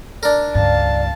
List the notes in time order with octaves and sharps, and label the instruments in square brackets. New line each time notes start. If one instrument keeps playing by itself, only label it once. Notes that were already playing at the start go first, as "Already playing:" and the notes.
[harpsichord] D4 A#4 [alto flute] D5
[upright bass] C#2 G2 [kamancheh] F5 A5